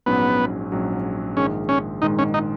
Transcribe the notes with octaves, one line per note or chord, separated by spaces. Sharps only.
A#1 G#2 F#3 B3 C#4
A#1 G#2 F#3 C#4
A#1 G#2 D#3 G#3 C#4
C#4
A#1 G#2 D#3 G#3 D#4
C#4
D#4